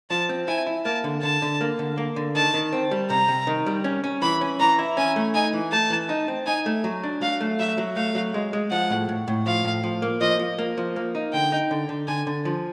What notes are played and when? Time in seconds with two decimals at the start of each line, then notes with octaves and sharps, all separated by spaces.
0.11 F3 A5
0.29 C4
0.48 E4 G#5
0.67 E4
0.85 A#3 A5
1.04 D3
1.22 D3 A5
1.42 D3
1.61 A#3
1.79 D3
1.98 A#3
2.16 D3
2.35 D#3 A5
2.54 D#3
2.72 C4
2.91 G3
3.10 C3 A#5
3.28 C3
3.47 D#3
3.66 G3
3.84 C#4
4.04 C#4
4.22 E3 B5
4.41 C#4
4.60 E3 A#5
4.79 E4
4.97 C#4 G#5
5.16 A3
5.35 D#4 G#5
5.53 E3
5.72 A3 A5
5.90 E3
6.09 D#4
6.28 C4
6.46 D#4 G#5
6.66 A3
6.84 F#3
7.04 D4
7.22 F#3 F5
7.41 A3
7.59 F#3 E5
7.78 F#3
7.96 A3 F5
8.15 F#3
8.34 G#3
8.53 G#3
8.71 F3 F#5
8.90 A2
9.09 A2
9.28 A2
9.46 F3 F5
9.65 A2
9.83 F3
10.02 A#3
10.21 F3 D#5
10.39 F3
10.59 A#3
10.78 F3
10.96 A#3
11.15 D#4
11.33 D3 G5
11.52 D#4
11.71 D3
11.89 D3
12.08 D3 G#5
12.27 D3
12.45 F3